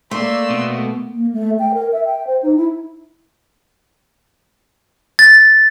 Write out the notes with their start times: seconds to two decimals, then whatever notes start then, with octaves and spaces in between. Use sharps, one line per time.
0.11 A3 A#3 D5 C6 E6
0.50 B2
1.13 A#3
1.33 A3
1.59 G5
1.74 A#4
1.92 E5
2.05 G5
2.27 C5
2.43 D#4
2.57 E4
5.19 A6